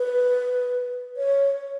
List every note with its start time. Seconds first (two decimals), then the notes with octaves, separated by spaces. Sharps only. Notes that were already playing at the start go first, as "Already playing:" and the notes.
Already playing: B4
1.17 C#5